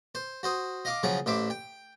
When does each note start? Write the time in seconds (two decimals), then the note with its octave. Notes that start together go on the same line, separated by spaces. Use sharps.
0.15 C5
0.43 F#4 C5 D#6
0.85 D#5 F5 D6
1.03 C#3 F3 F#3 G#4
1.26 A1 C5 E5 D6
1.50 G5